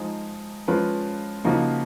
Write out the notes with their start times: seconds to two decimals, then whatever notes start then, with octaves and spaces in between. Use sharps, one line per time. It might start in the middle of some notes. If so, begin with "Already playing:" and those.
Already playing: F3 G#3 D#4 G#4
0.68 F3 G#3 C#4 F4 B4
1.44 C#3 F3 A#3 D#4 F#4